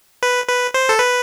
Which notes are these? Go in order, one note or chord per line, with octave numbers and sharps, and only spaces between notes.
B4
B4
C5
A4
B4